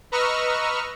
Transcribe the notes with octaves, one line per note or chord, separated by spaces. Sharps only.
B4 D#5 A#5 C#6 E6 F6